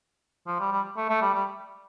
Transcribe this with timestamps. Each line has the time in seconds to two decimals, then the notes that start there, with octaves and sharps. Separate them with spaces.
0.47 F3
0.59 G3
0.72 G3
0.97 A3
1.09 A3
1.21 G3
1.34 G3